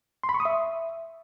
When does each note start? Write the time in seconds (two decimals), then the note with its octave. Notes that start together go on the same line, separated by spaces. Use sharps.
0.24 C6
0.29 B5
0.34 C#6
0.40 D#6
0.45 E5